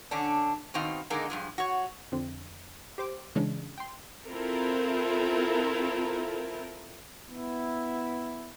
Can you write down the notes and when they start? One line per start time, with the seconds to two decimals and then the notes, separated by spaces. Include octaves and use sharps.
0.11 D3 C#4 D4
0.74 B2 D#3 C4 D#4 F5
1.10 D3 G#3 A#3 D#4
1.30 G2 F3 G#3
1.58 F#4 C#5
2.12 F2 D3 C4
2.98 G4 C5 D6
3.35 C#3 E3 G#3 C#4 D4
3.78 G5 C6
4.27 C4 E4 F4 A4 A#4
7.28 B3 E4